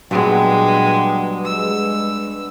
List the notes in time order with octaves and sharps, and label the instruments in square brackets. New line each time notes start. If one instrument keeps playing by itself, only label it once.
[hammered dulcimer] G2 B3 [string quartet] A#2 G#3 [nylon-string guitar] F#3 G#4 [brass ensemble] G5
[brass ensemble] G#3 [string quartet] E6